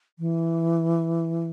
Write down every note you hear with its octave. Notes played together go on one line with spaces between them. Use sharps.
E3